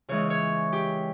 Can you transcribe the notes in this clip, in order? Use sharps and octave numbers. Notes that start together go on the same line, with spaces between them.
C#3 E3 G#3 C#5
C#5
G4